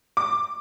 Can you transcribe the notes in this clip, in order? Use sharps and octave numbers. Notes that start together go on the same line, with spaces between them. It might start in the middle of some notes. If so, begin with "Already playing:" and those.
D6